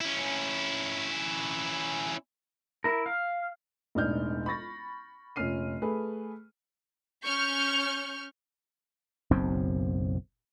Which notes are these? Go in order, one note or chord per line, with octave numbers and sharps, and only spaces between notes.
C#4 E4
E4 A#4
F5
E1 A1 D4 D#4 F6 G6
B5 C#6 A6 A#6
F1 A#2 C#4 F6 C7 D#7
A3 G#4 B4
C#4 C#6 F6 G6
F#1 B1 F#2 C4